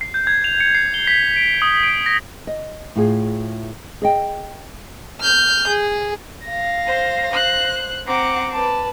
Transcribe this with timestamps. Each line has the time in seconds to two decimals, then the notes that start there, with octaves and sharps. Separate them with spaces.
0.01 C7
0.14 G6
0.27 G#6
0.44 F7
0.60 C#7
0.75 C7
0.94 G7
1.07 B6
1.36 D7
1.62 D#6
1.83 D7
2.06 A#6
2.47 D#5
2.96 A2 F4 G#4
4.02 G#4 D#5 G5
5.20 F6 G6
5.67 G#4
6.46 F5 A#6
6.87 C5
7.32 C5 F#6
8.07 C4 F#5 A#5 D6
8.52 B4 A5